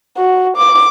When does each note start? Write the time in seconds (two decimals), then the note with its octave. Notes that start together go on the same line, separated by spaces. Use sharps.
0.17 F#4
0.57 D6